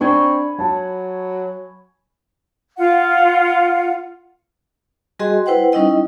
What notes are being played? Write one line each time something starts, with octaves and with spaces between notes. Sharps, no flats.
C4 D4 G#5 B5 C#6
F#3 A5
F4 F5 F#5
G3 F#4 G#4 D#5 G#5 C6
E4 B4 C5 F#5 G5
G3 C#4 D#4 E4 D#5 G5